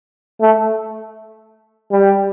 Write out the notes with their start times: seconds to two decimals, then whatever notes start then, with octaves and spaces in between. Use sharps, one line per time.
0.41 A3
1.92 G3